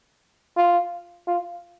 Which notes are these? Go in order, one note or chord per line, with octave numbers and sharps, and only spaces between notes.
F4
F4